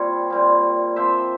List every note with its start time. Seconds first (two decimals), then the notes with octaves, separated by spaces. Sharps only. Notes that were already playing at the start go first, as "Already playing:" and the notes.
Already playing: A#2 G3 C4 C#5
0.30 A#2 G3 C4
0.96 C3 F3 C4 C5 E5